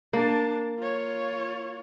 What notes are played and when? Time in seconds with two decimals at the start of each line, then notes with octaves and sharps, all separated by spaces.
0.13 A#3 D4 A5
0.79 F4 C#5